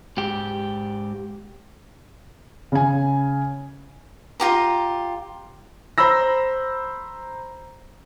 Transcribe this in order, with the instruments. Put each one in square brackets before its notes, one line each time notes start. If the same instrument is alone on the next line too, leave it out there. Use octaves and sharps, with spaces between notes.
[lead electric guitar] G#2 G4
[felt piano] C#3 G#5
[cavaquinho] F4 G4 A#5
[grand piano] C5 A#5 B5 E6 A#6